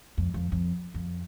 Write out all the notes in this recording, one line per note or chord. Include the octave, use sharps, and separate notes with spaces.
F2
F2
F2
F2